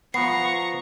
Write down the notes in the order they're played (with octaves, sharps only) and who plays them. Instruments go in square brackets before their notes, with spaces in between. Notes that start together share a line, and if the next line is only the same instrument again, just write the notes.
[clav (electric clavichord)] F3 B3 [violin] A#5 C#6 [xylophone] C7